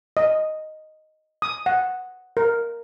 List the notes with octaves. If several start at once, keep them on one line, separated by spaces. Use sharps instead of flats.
D#5
D#6
F#5
A#4